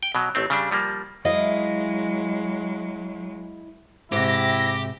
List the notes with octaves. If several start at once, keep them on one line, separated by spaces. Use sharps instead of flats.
G5
B2 F#3
A1 A3 C4
C#3 G3 D4
F3 G3 A#3
F#3 G#3 E4 D#5 F5
G#2 C3 E4 G4 A#6